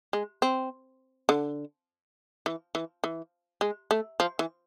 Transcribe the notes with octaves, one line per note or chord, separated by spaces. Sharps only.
G#3
C4
D3
E3
E3
E3
G#3
A3
F3
E3